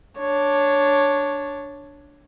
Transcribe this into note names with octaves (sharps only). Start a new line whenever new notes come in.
D4 C#5